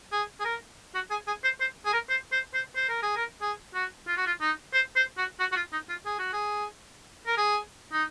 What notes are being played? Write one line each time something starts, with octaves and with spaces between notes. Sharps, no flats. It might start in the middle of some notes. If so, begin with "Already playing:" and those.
G#4
G#4
A#4
F#4
G#4
G#4
C5
C5
G#4
A#4
C5
C5
C5
C5
A#4
G#4
A#4
G#4
F#4
F4
F#4
F4
D#4
C5
C5
F#4
F#4
F#4
F4
D#4
F4
G#4
F#4
G#4
A#4
G#4
D#4